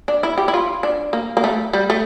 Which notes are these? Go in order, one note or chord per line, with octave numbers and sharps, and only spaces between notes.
D4
E4
G4
E4
F4
D4
A#3
A#3
A3
G3
A3